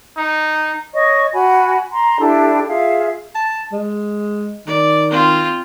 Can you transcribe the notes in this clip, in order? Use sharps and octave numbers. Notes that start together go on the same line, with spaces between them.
D#4
C#5 D#5 C#6
F#4 G#5 B5
A#5 C6
D4 E4 G4 A4
F4 G#4 E5 F5
A5
G#3
D#3 D5
C4 F4